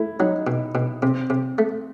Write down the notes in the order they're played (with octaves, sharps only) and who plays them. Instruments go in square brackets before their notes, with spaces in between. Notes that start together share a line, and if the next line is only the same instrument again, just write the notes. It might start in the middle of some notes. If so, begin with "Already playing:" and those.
Already playing: [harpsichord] A3 [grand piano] E4
[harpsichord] F#3 [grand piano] D#4
[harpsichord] B2
B2
[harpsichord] C3 [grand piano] C4
[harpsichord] C3
A3